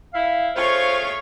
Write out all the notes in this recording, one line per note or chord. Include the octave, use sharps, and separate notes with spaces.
E4 F5
G#3 A3 F4 C5 C#5 F5 C#6